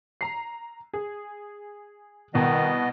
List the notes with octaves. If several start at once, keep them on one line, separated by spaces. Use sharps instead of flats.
A#5 C7
G#4
C2 B2 D#3 B3 D#5